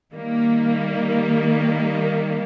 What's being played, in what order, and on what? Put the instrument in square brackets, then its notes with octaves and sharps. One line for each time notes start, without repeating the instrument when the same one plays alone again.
[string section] D#3 G3 A#3